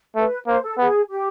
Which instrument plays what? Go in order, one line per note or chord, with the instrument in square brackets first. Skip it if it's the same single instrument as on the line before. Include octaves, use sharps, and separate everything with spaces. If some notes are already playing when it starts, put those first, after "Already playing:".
[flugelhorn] A3 [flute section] B4
[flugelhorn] A#3 [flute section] C5
[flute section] A4
[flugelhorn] B3 [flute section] G#4
[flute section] G4